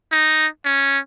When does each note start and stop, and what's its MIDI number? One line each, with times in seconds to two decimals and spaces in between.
0.12 0.47 63
0.65 0.99 61